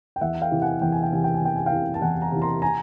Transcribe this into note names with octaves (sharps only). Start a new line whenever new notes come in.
G5
E2 E5 F#5
F5 G5
C3 E3
F#5 G#5
E2 G5
G#5
G5
C3 E3 G#5
G5
G#5
E2 G5
G#5
F5 G5
C3 E3
A5
E2 F#5 G#5
G#5 A#5
C3 E3
A#5 C6
G#5 A#5